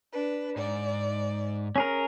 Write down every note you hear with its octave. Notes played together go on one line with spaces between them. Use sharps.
D4 B4
G#2 D5
C#4 G#4 A#4